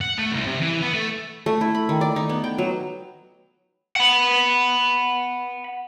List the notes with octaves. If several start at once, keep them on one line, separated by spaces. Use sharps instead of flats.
F#5
A3
C2
C3
E3
B3
A3
A3
E4
B5
D#3
D5
D#4
B3
G5
F#3
F#5 B5